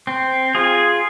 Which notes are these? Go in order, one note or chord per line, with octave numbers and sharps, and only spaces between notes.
C4
F4 G#4